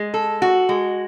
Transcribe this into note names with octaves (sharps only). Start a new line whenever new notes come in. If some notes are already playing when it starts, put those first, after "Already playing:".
Already playing: G#3
A4
F#4
G#3